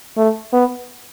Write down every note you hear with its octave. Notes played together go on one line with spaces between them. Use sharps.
A3
B3